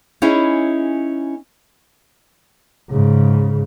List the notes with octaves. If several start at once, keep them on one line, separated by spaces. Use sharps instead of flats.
C#4 D#4 E4 G#4
G#2 C#3